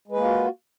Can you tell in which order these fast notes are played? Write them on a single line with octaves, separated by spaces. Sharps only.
G#3 B4 A#3 F4 F#4